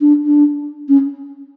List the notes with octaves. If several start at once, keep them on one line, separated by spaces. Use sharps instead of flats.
D4
D4
C#4